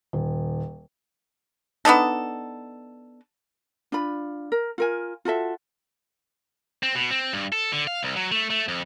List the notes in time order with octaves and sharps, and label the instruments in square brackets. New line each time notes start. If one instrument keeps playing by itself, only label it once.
[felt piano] D#1
[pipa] B3 D4 D#4 A4
[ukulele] D4 F4 B5
A#4
F4 A#4 G#5
F4 F#4 A4 E5
[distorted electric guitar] C4
B2
C4
G2
A4
D3
F5
C2
F#3
A3
A3
F2